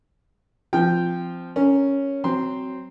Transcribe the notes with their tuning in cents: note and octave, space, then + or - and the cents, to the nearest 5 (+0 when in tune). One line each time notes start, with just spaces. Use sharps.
F3 -5 C4 -10 G5 +0
C#4 +0 A#4 -20
F#3 +15 C4 +0 C6 +0